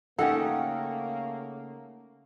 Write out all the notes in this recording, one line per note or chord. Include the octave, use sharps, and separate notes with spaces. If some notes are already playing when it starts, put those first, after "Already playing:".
C#3 A3 A#3 C#4 D#4 G4 A4 F#5